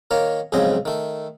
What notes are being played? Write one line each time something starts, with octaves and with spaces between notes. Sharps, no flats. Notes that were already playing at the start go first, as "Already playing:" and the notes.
D#3 A#3 A#4 C#5
B1 F2 G#2 C#3 C4 D#5
D#3 A3